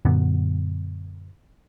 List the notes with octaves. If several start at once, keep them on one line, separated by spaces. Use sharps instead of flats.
F#2 A#2 D3 B3